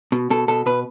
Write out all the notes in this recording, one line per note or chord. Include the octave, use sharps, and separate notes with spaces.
B2
B2 A4
B2 A4
B2 B4